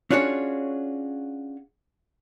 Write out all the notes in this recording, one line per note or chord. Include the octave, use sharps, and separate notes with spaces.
C#4 D4 F4 F#4 G#4 C#5